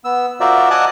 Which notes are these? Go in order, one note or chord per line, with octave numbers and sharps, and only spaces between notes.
B3 E6
F4 F#4 A#4 C5 D5 E5
D#5 F#5 G#5 A5 D6